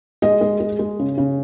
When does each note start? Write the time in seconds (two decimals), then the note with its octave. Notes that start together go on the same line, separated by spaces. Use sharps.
0.22 G#3 D#5
0.41 G#3
0.60 G#3
0.79 G#3
0.99 C#3
1.18 C#3